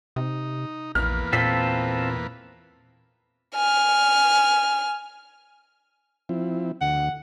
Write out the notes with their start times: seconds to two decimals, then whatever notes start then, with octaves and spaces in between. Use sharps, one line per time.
0.16 C3 D#4
0.95 A#1 E2 A#3 B4 F6
1.33 A#2 C4 F4 A4 B6
3.55 G#5 F6
6.29 F3 C4 E4
6.81 D2 F#5